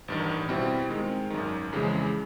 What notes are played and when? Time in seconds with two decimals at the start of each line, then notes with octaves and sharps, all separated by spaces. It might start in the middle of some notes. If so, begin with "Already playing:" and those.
0.08 A1 G2 D#3
0.49 B2 G3 C4 E4
0.89 D#3 G#3 C4
1.30 G#1 F#2 D#3
1.73 F2 C#3 E3 G#3